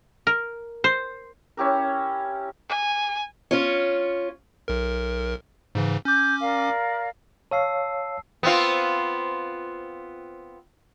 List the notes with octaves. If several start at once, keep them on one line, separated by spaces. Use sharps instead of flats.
A#4
C5
C#4 E4 G4 A#4
G#5
C#4 F4 C#5
B1 A#4
G#2 C#3 E3
C#4 D6 G6
A#4 D5 F5
C#5 F5 A5 E6 C7
B3 C4 F4